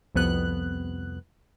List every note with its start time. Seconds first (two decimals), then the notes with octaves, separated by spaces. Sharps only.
0.15 C2 F2 B3 F#6